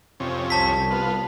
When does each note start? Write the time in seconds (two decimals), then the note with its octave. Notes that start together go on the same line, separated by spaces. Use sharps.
0.20 F2 C3 C#4
0.50 C2 A5 B6
0.91 B3 F4